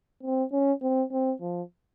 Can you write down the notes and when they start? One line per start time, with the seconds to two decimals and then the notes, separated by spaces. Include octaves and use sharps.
0.23 C4
0.52 C#4
0.82 C4
1.12 C4
1.41 F3